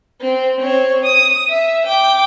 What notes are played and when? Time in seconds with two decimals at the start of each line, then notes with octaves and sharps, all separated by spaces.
0.21 C4
0.60 C4 C#5
1.04 D#6
1.49 E5
1.85 G5 D6